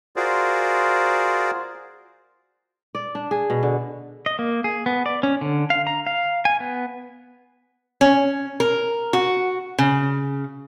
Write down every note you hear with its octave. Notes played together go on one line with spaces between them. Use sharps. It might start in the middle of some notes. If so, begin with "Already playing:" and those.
F4 F#4 G#4 A#4 C5 D5
D5
D4
G#4
B2
D3
D#5
A#3
G#4
B3
D5
C#4
D3
F5
A#5
F5
G#5
B3
C#4
A#4
F#4
C#3